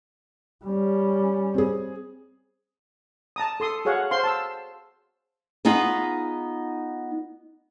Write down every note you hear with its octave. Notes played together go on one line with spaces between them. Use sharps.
G3 C#4
C4 G#4
A5 A#5 D#6
A4 C6 D#6
F#4 G#4 C#5 F5 F#5
C5 F5 C6
A5 E6
B3 D#4 F4 G#4